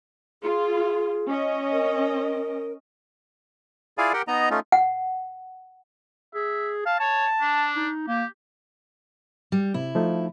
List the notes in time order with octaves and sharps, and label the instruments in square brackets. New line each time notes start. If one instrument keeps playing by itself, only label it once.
[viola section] F4 [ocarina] G#4
[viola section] C#4 D#5
[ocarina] A#4
[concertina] E4 F4 G#4 D5 F5 G#5
G4 A#4 F#5 G5
B3 D#4 D#5 A#5
A3 C#4 D#4 F4
[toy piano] F#5
[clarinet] G#4 [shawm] E5
[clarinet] F5 [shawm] A5
[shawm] C#5 [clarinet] A5
[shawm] D4
[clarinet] D#4
[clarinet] A#3 [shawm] G4
[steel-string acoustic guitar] G3
[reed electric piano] C3 [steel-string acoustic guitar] E4
[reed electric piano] F3 A3 D#4